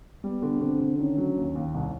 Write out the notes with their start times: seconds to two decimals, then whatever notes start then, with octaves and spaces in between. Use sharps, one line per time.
0.24 G3 B3
0.42 D3
0.61 D3 C4
0.80 D3
0.98 D#3 C#4
1.17 F#3
1.37 D#2
1.56 D#2
1.74 C2